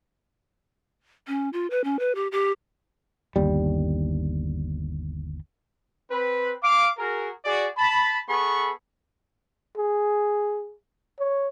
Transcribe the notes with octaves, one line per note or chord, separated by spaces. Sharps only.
C#4
F4
B4
C#4
B4
G4
G4
G1 D#2 G3
C4 B4
F5 D6
F#4 G#4 A#4
F#4 G#4 D5
A5 B5
B3 G#4 A4 B5 C#6
G#4
C#5